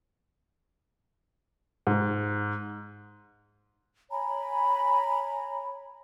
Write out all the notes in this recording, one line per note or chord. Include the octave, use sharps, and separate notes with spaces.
G#2
C#5 G#5 A#5 B5